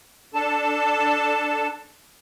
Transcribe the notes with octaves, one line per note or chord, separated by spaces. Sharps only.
D4 A4 A5